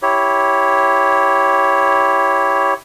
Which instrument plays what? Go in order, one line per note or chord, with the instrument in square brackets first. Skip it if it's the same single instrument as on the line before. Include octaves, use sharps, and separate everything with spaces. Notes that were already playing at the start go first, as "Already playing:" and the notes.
[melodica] E4 G4 C#5